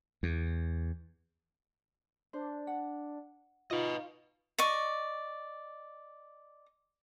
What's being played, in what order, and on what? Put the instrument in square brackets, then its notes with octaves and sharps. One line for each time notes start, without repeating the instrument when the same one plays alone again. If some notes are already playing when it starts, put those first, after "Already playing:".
[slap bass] E2
[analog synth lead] D4 [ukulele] C5
[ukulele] F#5
[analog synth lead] D#4 [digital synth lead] F4 [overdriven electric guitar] B4 D#5
[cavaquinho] D5 D#5 C#6